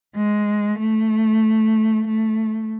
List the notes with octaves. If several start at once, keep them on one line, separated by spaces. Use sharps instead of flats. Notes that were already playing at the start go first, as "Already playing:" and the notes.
G#3
A3
A3